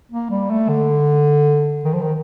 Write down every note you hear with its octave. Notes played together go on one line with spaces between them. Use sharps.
A#3
G3
A3
D3
D#3
F3
D#3